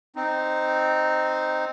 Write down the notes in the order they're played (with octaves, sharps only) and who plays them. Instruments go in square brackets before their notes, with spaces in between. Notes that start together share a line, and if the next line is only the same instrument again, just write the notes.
[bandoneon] C4 D#4